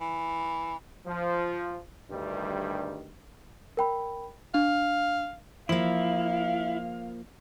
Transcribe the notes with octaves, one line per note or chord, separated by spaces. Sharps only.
E3
F3
D2 G2 D#3 G3
A#4 G5 B5
D4 F5
F3 A#3 E4 F5